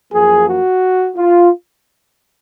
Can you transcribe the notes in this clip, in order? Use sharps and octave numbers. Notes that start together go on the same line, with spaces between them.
F#2 F3 A#3 G#4
F#4
F4